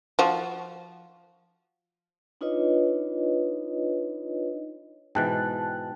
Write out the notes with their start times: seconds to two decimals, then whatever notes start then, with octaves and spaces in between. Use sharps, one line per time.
0.19 F3 F#4
2.41 D4 D#4 F4 B4 C#5 D#5
5.15 G#2 B2 E3 G5 A5 F#6